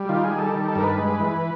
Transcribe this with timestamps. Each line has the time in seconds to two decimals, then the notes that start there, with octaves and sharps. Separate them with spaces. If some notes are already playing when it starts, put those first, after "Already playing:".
Already playing: G3
0.09 D#3 F4
0.24 G#4
0.31 G3
0.39 A4
0.53 D#3
0.68 A4
0.75 G2 A#4
0.83 B4
0.98 G#3
1.20 E3